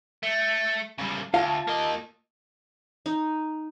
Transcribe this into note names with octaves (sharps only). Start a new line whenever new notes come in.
A3
C#3 G3
D2 F4 F5 A5
A#3 D#5
D#4